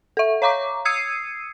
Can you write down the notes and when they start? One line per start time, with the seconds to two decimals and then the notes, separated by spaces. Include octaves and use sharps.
0.17 A4 E5
0.42 C#5 F5 A#5 C#6 D6
0.85 D#6 E6 G#6 C7 C#7 D#7